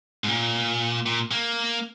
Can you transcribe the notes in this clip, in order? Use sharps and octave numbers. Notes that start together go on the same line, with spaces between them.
G#2
A#2
A#2
A#3